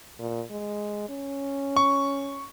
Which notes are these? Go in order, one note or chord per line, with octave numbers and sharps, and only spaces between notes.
A#2
G#3
C#4
C#6